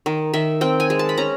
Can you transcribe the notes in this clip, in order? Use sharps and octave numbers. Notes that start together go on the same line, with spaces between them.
D#3
D#3 E5
C4 G5
G#5
G#3
A5
B5
C#4 A#5